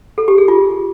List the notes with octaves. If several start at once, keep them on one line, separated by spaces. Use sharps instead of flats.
A4
G4
G#4
F4